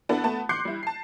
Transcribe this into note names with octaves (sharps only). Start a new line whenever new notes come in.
B3 D4 E4 F#4 A4
A3 B3 A5
C6 D6 F#6 G6 C7 C#7
G3 E4
A5 C7